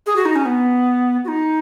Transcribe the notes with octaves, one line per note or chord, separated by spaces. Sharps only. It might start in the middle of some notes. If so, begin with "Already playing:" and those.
G#4
F#4
D#4
C#4
B3
F#4
D#4